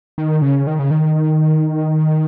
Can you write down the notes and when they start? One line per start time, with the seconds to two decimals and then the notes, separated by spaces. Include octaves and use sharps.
0.18 D#3
0.42 C#3
0.67 D#3
0.79 C#3
0.91 D#3